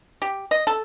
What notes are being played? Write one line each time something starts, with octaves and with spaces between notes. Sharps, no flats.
G4
D#5
A4